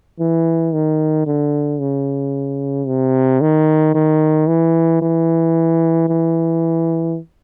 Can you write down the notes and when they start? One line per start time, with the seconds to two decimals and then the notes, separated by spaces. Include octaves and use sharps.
0.19 E3
0.73 D#3
1.26 D3
1.80 C#3
2.87 C3
3.41 D#3
3.94 D#3
4.47 E3
5.01 E3
6.08 E3